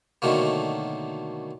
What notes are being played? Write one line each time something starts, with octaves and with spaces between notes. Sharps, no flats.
B2 D3 D#3 F#3 A3 A#3